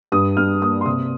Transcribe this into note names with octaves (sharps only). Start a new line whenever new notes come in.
G2 D#6
G2 F6
A#3 D#6
C6
C3 D#6